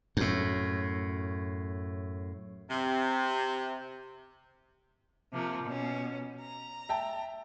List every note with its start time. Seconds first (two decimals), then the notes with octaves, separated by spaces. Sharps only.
0.17 F#2 A2
2.69 C3
5.32 C3 F3 A#3
5.64 B2 C#4
6.40 A#5
6.89 E5 G5 A5